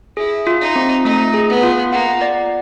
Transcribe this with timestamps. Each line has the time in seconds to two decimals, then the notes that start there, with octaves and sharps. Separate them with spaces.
0.17 E4 G#4
0.47 F4
0.61 D#4
0.76 C4
1.05 A3 D#4
1.34 G#4
1.49 B3
1.63 F4
1.92 A#3 F#5
2.22 D5